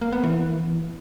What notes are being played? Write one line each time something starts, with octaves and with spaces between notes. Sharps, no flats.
A#3
B3
E3